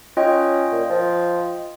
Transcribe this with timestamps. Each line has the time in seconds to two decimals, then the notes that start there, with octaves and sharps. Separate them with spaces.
0.17 C#4 F4 D#5 G5
0.72 A#2
0.90 F3